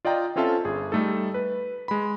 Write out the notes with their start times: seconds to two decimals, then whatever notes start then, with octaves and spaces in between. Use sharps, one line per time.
0.05 F4 D5 D#5 G5 A#5
0.36 C4 C#4 F4 A4 E5 A5
0.65 G1 G#4
0.92 G3 A3 D#4 A4
1.34 B4
1.88 G#3 B5